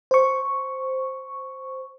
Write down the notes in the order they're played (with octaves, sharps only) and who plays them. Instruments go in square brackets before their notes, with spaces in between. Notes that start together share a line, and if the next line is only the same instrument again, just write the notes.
[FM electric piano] C5 C#6